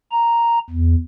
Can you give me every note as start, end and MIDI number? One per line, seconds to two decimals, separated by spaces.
0.12 0.59 82
0.70 0.95 40